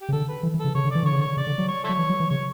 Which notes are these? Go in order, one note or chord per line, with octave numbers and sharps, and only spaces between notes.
G4
C#3
D3 A4
B4
E3
E3
A4
C#3
C#3 C#5
D3
E3 D5
D3 C#5
C#3
D3 C#5
C#3 D5
D3
F#3
C#5
E4 A4 C#5
F#3
E3
F#3
E3
C#3 C#5